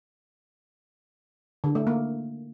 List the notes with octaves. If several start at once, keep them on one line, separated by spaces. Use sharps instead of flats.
D3
A3
A#3